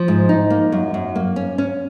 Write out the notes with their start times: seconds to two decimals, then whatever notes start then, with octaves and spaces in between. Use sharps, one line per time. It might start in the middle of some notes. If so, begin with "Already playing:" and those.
Already playing: F3
0.08 G#2
0.29 D#4
0.50 A#3
0.72 F#2
0.94 F#2
1.15 A#3
1.36 C#4
1.58 C#4